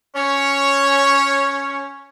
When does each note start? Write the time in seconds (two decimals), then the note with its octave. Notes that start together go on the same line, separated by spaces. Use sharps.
0.15 C#4 C#5